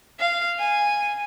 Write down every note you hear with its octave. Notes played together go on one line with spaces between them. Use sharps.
F5
G#5